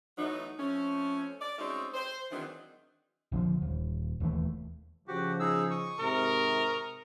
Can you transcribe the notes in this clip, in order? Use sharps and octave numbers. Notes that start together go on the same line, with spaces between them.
E3 F#3 A3 B3 D#4
F3 A3 C4 C#4
D5
G#3 A3 C4 C#4 D#4 F#4
C5
D#3 E3 F#3 G#3 C4 D4
A#1 D3 D#3 F3
D#1
E1 D#2 E3 A3
C#3 F3 F#4 G4
D#4 G#4 E6
C#6 D#6
G#2 C3 A#4